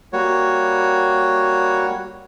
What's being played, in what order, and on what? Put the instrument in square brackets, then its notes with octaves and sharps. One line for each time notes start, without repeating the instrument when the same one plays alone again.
[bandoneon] G3 A#3 F#4 C#5